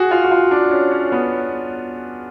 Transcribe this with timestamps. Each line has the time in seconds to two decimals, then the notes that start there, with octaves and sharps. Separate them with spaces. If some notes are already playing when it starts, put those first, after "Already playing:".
Already playing: F#4 G#4
0.11 F4
0.24 F#4
0.31 F4
0.51 D4
0.71 C#4
0.92 C#4
1.12 B3